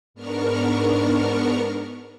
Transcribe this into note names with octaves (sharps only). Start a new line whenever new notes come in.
G#2 B3 D4 A#4 C#6 F6